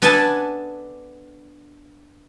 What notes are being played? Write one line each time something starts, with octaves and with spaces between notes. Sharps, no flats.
B3 D4 A4 B4 G#5 A5